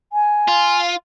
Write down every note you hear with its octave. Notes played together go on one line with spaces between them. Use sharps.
G#5
F4